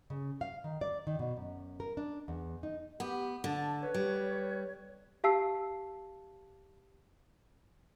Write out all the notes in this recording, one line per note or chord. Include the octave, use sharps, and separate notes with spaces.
C#3
F5
D#3
D5
D#3
B2
F#2
A#4
D4
E2
D#4
B3 G4
D3 A5
B4 C#5
G3
G4 F5 A5 E6 C7